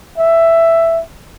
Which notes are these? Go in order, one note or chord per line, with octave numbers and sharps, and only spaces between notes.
E5